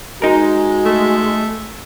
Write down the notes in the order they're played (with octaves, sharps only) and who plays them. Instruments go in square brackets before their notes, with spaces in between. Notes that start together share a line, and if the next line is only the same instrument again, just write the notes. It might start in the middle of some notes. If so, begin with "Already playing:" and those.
[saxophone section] G#3 [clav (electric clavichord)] D#4 A#4 [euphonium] F#4
[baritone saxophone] A3